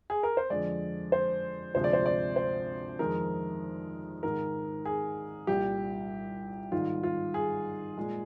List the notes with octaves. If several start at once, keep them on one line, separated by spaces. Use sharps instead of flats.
G#4
A#4
C5
F2 D3 G#3 D5
C5
D2 C3 F3 G#3 C5
D5
C5
D5
C5
F2 D#3 G#3 A#4
G#2 D#3 G#3 A#4
G#4
C2 A#2 G3 G4
G#2 D#3 G3 F4
F4
G#4
A#2 G#3